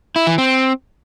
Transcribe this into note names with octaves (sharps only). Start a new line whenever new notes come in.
E4
E3
C4